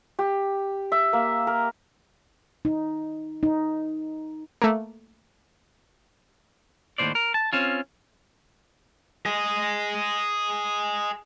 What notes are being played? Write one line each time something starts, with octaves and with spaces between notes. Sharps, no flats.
G4
E5
A#3
A#4
D#4
D#4
A3 A#3
D#2 A2 C3 C5 D5
A#4
A5
C4 C#4 F4
G#4 D#5